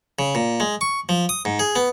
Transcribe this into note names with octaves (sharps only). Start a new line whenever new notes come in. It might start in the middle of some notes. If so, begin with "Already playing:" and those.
C#3
A#2
G#3
C#6
F3
D#6
G#2
G#4
B3